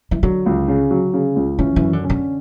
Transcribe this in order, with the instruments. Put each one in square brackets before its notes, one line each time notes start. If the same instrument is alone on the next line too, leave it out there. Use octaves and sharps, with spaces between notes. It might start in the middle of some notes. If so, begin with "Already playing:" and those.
[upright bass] E3
[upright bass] D3 [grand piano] F#3
[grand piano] C#2
C#3
F#3
C#3
C#2
[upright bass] E3 [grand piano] C#4
[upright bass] E3
[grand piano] F#2
[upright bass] D3
[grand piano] C#4
[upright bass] D3